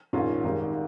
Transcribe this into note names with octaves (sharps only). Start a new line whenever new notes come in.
A#1 G#2 D#3 C#4 F4
G#1 G#2 D#3 G3